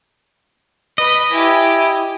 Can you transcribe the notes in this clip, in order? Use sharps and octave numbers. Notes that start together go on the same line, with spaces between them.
B4 D#5 B5
E4 G4 G#5